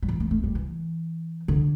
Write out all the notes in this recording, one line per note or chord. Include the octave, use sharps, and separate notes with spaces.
G3
E3
A3
A3
G3
E3
D3